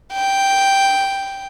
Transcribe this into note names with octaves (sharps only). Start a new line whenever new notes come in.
G5